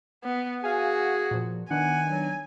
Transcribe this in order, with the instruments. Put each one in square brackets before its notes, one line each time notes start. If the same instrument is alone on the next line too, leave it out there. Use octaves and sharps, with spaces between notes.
[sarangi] B3
[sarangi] F#4 [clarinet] G#4 [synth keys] F5 G#5
[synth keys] A#2 F3
[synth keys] D#3 B3 D4 [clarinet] F#5 [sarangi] G#5
[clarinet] F#3